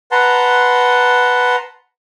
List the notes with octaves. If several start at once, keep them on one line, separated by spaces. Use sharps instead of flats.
B4 F#5 A5 A#5 C6